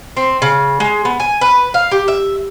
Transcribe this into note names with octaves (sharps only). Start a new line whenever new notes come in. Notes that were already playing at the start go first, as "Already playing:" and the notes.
C4
C#3
G#3
B3
G#5
B4
F5
G4
E5